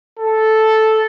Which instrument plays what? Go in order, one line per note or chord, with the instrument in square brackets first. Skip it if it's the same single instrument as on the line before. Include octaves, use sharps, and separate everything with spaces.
[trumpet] A4